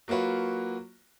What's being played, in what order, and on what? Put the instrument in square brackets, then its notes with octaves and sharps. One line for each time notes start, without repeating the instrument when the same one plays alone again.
[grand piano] F#3 A#3 F4 F#4 B4